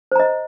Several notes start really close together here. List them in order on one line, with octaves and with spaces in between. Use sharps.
C5 A#5 D#5